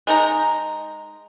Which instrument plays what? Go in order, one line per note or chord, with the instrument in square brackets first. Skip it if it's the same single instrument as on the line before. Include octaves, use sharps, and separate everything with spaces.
[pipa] G#3 D#4 A#5